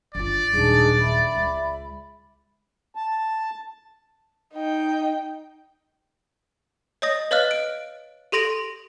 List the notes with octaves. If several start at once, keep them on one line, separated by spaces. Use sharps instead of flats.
G1 F4 D5
D#1 B1 D4 D#4 G#4
E5 B5
C#2
A5
D#4 G5
C#5 D#5 D#6 A#6
B4 C#5 D#5 F5 F6 F#6
D7
G4 A4 C6 A#6 D7 F7